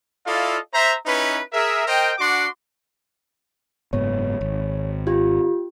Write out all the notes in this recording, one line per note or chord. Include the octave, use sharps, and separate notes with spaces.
E4 F4 A4 D5 D#5 F5
C5 E5 A#5
C#4 D#4 E4 B4
G#4 A#4 E5
A#4 C5 D#5 G5
D4 F#4 F#5 C6 D6
F#1 G#2 B3 C#5
G#1
F4 G4